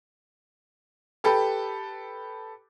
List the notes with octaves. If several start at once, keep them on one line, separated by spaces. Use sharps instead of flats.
G4 A4 B4